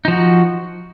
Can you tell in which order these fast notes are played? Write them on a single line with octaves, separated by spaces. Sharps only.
D#4 F3 F#4